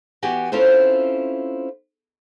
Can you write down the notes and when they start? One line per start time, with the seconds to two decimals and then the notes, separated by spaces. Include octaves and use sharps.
0.22 E3 B3 F#4 G4 G#5
0.52 C4 C#4 E4 F4 A4 C5